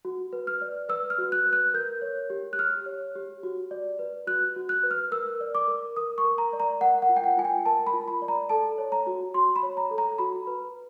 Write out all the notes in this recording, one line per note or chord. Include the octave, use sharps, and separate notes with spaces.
F#4
B4
F6
D5
B4 E6
F6
F#4
F#6
B4
F#6
A#4 G6
C#5
G4
F#6
G4 F6
C#5
G4
F#4
D5
B4
F#4 F#6
F#4
F#6
B4
F6
A#4 E6
D5
D6
A#4
A#4 D#6
C#6
A#4
A#5
D5
A#5
A#4 F#5
F#5
F4
G5
F#5
F4 G#5
G5
A#4 A5
B5
F4
B5
D5
A#5
A4 A5
C#5
A#5
F#4
F#4 C6
B5
C#5
A#5
A4
A#5
F#4 B5
B4